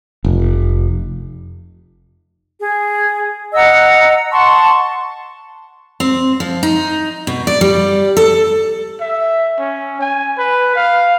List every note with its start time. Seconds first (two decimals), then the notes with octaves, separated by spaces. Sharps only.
0.24 F1
2.61 G#4
3.53 D#5 F#5 A#5 E6
4.32 F#5 A5 C6 C#6
6.00 C4
6.40 F3
6.63 D#4
7.27 B2
7.47 D5
7.61 G3
8.17 A4
9.00 E5
9.59 C#4
10.01 G#5
10.38 B4
10.75 F5